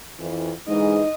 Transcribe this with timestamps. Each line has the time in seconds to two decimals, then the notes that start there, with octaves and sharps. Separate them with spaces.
0.19 F2 E3
0.68 G#2 D3 E3 G#3 D#4 D#5